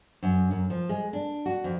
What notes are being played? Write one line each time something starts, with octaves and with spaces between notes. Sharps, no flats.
F#2
F#2
F3
G#3
D4
F#4
F2